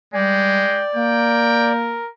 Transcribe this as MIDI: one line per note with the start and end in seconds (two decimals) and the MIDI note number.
0.14 0.65 55
0.14 0.81 56
0.14 1.72 74
0.14 0.86 79
0.95 2.00 58
0.95 2.10 70
0.95 1.76 79